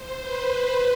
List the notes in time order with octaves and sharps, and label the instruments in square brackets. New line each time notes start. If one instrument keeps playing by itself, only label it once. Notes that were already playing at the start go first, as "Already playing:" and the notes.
Already playing: [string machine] C5
B4